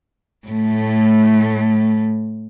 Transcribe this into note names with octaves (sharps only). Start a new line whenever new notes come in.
A2 A3